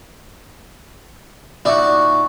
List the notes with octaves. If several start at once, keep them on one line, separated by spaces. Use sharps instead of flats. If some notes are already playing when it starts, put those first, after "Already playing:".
A#2 D#4 E4 F#4 D5